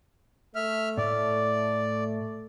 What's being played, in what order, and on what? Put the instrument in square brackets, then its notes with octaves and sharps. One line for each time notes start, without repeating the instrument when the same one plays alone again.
[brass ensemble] A3 [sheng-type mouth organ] E5 F6
[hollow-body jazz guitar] A2 [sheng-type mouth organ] D5